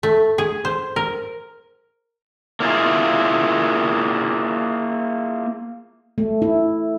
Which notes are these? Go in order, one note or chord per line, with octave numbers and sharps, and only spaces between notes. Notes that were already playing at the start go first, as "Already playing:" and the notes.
A3
G#4
C5
A#4
A#3 E4 F4 G#4
A3
E4